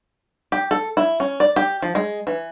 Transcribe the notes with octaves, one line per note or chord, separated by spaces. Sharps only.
G4
A4
E4
C#4
D5
G4
F3
G#3
E3